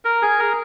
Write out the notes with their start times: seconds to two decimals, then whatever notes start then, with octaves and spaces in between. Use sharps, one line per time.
0.05 A#4
0.22 G#4
0.39 A#4